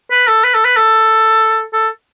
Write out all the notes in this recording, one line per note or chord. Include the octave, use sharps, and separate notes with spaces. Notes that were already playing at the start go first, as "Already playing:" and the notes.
B4
A4
B4
A4
B4
A4
A4